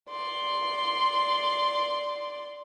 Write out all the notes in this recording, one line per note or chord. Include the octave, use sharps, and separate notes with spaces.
D5 C6